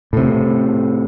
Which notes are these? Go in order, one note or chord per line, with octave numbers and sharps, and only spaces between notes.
A2 C3